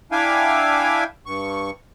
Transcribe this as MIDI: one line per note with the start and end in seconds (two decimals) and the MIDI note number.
0.12 1.04 62
0.12 1.04 64
0.12 1.04 76
0.12 1.04 77
0.12 1.04 79
0.12 1.04 80
1.26 1.71 43
1.26 1.71 85